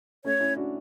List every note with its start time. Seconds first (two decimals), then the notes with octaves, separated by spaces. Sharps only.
0.25 A3 C#4 C#5
0.40 C#4 E4
0.57 D4 F#4